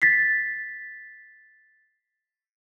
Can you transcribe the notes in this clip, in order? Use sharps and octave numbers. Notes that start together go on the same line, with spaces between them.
A6 B6 C7